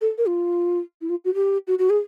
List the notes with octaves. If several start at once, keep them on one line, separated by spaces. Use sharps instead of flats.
A4
A#4
F4
E4
F4
F#4
G4
F#4
F#4
G#4